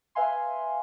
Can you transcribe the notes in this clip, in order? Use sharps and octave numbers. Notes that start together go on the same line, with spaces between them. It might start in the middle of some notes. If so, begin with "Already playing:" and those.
B4 E5 F5 G#5 C6